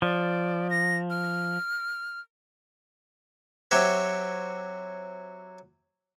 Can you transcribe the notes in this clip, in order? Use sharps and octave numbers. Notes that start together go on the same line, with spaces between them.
F3 D5
A#6
F6
F#3 C4 F#4 G4 C#5 E5